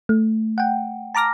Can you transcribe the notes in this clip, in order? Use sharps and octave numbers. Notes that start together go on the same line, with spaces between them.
A3
F#5 G5
A5 A#5 D6 F6 A#6